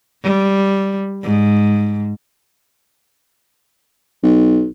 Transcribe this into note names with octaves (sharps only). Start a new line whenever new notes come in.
G3
G#2
B1